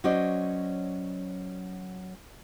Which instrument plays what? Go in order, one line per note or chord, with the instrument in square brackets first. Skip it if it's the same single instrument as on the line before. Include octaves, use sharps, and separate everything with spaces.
[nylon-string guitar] F#3 C#4 F#4 C5 D5 D#5